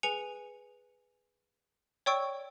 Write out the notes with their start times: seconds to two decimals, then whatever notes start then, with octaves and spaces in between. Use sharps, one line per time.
0.03 G#4 B4 G#5 C#7 F7
2.06 C#5 D5 G5 C#6 E6 D7